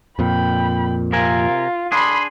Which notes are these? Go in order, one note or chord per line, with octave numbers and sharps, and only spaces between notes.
F2 A#2 G5 B5
C3 F4 A#4 G#5
D4 G#4 B5 C6